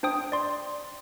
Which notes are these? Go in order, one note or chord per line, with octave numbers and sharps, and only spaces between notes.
D4 C5 G5 D#6
D5 C6